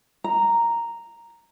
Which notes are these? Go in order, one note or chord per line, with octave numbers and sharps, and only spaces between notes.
A#5